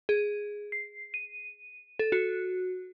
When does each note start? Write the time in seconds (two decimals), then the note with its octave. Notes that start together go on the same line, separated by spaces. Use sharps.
0.09 G#4
0.72 C7
1.14 D#7
1.99 A4
2.12 F#4